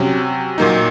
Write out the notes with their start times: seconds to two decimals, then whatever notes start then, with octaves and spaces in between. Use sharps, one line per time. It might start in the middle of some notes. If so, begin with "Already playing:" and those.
Already playing: C3 F#3 C#4
0.58 A#2 F#3 A#3 D#4